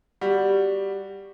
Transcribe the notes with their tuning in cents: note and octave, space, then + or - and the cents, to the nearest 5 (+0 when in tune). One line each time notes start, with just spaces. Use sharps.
G3 +0 F#4 +0